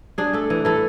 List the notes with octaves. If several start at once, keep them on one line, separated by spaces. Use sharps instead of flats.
D4 G#4
A3 A4
E3
E3 A4